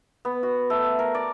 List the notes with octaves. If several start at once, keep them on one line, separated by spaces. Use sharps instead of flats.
B3
F#4
A3
A#4
D5